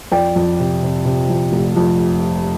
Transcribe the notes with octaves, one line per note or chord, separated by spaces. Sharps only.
F2 D5 G5
F2
C3
C3
C3
F2
F1
F2